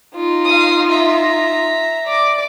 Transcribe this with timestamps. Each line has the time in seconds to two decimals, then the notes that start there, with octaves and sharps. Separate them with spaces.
0.16 D#4 F4
0.45 F5 D#6
0.90 E5 A#5
2.06 D5 D6